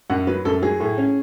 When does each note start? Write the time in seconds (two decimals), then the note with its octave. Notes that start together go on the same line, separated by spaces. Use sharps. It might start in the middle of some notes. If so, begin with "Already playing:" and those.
0.10 F#2 F#5
0.27 F#3 B4
0.45 F#2 A4
0.62 F#3 G#4
0.80 A2
0.98 C#4